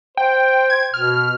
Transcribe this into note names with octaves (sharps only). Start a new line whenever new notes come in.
C5 G5
G#6
B2 F6